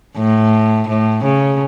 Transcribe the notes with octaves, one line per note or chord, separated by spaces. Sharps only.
A2
A2
C#3